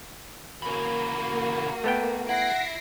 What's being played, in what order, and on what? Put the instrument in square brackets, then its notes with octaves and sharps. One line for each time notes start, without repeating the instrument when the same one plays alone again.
[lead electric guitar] C#3 E3 [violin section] A#3 F#4
[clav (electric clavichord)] A3 B3 G5
[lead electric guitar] E4 [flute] F#5 [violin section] A#6 C7 D7